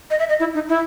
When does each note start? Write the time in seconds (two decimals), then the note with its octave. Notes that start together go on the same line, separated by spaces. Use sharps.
0.10 D#5
0.19 E5
0.29 D#5
0.40 E4
0.54 D#4
0.69 E4